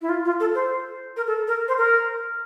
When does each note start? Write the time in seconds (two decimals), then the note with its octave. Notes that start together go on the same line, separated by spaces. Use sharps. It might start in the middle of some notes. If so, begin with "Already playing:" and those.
0.02 E4
0.09 F4
0.25 F4
0.40 A4
0.55 C5
1.17 A#4
1.27 A4
1.47 A#4
1.68 C5
1.78 A#4